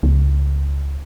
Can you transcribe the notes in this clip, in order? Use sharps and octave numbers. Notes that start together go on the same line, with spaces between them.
C#2